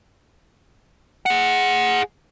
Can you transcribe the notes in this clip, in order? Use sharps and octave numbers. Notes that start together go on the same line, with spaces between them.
G#4 F#5